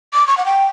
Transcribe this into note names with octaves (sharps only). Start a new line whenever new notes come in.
D6
C#6
F#5
G5